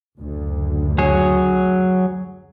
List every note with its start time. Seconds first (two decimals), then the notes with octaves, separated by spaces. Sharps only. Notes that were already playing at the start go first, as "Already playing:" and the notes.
0.17 F#1 D2
0.98 F#3 G#4 C#5